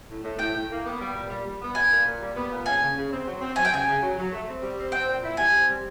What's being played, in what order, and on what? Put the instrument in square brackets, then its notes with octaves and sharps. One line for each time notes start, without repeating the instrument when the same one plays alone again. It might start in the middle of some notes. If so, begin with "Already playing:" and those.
[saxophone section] A2
A2
[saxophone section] A2 [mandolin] G5
[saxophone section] A2
A#3
B3
G3
A#2
G3
G3
B3
[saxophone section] A#2 [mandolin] G#5
[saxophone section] A#2
A#2
G3
B3
A#2
[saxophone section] C#3 [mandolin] G#5
[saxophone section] C#3
C#3
C4
F#3
C4
[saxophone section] F#3 [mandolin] G#5
[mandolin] G5
[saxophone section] C#3 [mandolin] G#5
[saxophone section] C#3
F#3
F#3
A3
C4
G3
C4
[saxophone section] C4 [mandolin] G5
[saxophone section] A#2
E4
[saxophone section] G3 [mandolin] G#5
[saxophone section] C4
G3